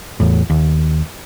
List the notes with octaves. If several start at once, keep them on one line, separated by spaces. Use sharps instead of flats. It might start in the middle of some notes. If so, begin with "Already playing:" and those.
E2 A2
D#2